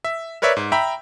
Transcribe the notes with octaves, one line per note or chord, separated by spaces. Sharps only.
E5
A#4 B4 C#5 D5 E5
G#2
E5 G5 A#5 B5